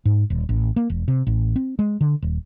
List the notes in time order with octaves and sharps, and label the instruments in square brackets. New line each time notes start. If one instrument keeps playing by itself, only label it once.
[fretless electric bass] G#2
D#1
A1
A#3
E1
C3
A1
C4
G#3
D3
D#1